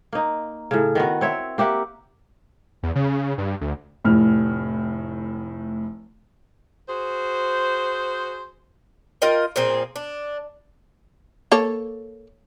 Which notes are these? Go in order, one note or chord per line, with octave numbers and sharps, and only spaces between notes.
A#3 D#4
A2 C#3
D#3 B3 F#4
C4 C#5 E5
A#3 G4 E5 F#5
E2
C#3
G2
D2
F1 A2 F6
F#4 G#4 C5
F4 A#4 D#5 G5
A#2 F3 C4 G#4
D4
A#3 A4 C#5